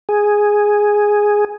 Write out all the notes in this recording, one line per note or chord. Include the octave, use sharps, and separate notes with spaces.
G#4